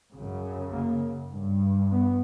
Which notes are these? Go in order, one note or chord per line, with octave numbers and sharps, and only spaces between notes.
F#2 C#3
A#3
G2
B3